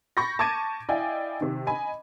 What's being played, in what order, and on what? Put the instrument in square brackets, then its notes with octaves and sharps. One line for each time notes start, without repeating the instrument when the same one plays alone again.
[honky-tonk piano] B5 C#6 G6 A6 A#6
A5 C#6 D6 G#6 A6 D#7
E4 D5 D#5 F5 G5 G#5
C3 D#3
D#5 G#5 B5